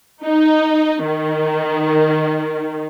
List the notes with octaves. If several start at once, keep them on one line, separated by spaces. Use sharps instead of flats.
D#4
D#3